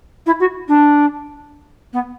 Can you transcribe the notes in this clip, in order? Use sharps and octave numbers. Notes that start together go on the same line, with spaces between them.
E4
F#4
D4
B3